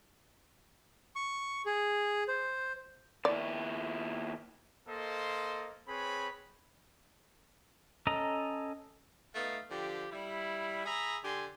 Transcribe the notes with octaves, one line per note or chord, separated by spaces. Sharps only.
C#6
G#4
C5
D#2 E4 D5
A#3 A4 C5 D#5 C6
C4 G#4 B4 C#5 B5
C#4 A4 D#5 A#5
A3 B3 D#4 F5
D3 F3 G4
G3 E4
G#4 E5 A#5 B5
D3 G4 G#5 C6